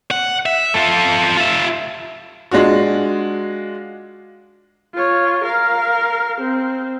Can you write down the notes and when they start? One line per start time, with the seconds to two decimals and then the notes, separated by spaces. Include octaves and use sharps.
0.11 F#5
0.46 E5
0.74 F4 A4
1.37 F4 E5
2.51 G#3 D4 F4 F#4
4.94 F4 C#5
5.44 A#4 F5
6.41 C4